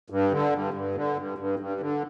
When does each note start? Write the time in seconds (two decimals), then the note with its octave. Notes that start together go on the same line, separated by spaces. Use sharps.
0.10 G2
0.31 D3
0.53 G2
0.74 G2
0.95 D3
1.17 G2
1.38 G2
1.59 G2
1.80 D3